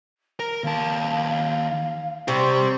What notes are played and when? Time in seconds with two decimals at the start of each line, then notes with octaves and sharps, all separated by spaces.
0.40 A#4 A#5
0.64 D#2 F5 A5
2.28 C3 G4 D5 C#6